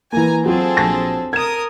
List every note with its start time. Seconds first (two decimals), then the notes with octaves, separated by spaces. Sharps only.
0.13 E3 A#3 G#5 A#5
0.46 F#3 C4 F4 F#4 G#4 A4
0.77 A#1 A5 A#6
1.33 A#4 D#6 G#6 E7